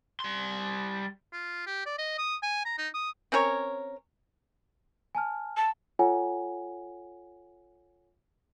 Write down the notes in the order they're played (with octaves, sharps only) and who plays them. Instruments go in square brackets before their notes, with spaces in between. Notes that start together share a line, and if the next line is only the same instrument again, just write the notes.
[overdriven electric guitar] G3 C6
[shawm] F4
G4
D5
D#5
D#6
G#5
A#5
D#4
D#6
[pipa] C4 C#4 A#4 C#5
[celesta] G#5 A5 F6
[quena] A5
[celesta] F4 A4 C#5 F#5 G#5